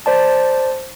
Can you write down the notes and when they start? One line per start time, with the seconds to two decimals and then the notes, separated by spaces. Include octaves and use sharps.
0.06 C5 D5 A5